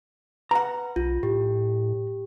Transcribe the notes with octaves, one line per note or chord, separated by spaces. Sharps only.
B4 F#5 A#5
B1 F4
A2 G4